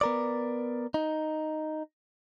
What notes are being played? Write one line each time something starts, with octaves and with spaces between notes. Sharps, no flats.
B3 A#4 D5
D#4